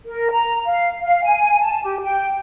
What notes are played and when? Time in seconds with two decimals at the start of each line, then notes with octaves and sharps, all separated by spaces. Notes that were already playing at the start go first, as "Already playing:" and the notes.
0.06 A#4
0.32 A#5
0.66 F5
1.01 F5
1.24 G#5
1.60 A5
1.83 G4
2.03 G5